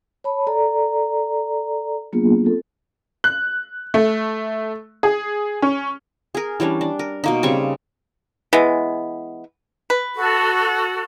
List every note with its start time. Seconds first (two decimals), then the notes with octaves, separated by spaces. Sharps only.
0.24 C#5 A5 B5
0.47 A4 D5 A#5
2.12 F#3 A#3 B3 D4 F4 G#4
2.44 C4 F4 A4
3.24 F#6
3.94 A3
5.03 G#4
5.62 C#4
6.35 G#4 A#4
6.60 E3 G3 C#4 D4
6.81 D4
6.99 A#4
7.24 B2 A#3 D#4
7.43 C#3 G3 C4 C#6
8.53 E3 G#3 B3
9.90 B4
10.15 F#4 A4